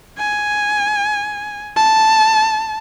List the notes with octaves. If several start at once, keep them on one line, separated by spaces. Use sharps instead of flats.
G#5
A5